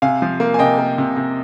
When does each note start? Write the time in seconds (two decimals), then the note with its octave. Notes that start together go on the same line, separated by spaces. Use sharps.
0.02 C3 F5 G#5
0.22 F3
0.40 A#3
0.54 G#5
0.59 C3 D#5 G5
0.79 A#3
0.98 C3
1.16 C3